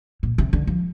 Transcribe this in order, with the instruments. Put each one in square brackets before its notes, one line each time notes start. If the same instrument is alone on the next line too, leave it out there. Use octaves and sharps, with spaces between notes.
[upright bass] A#2
C3
D3
F3